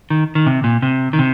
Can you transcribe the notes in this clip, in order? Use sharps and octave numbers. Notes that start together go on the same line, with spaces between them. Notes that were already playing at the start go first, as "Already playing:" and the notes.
D#3
D#3
C3
A#2
C3
D#3
C3